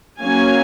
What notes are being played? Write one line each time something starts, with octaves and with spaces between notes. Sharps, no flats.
F#3 A#3 C#4 F5 G#5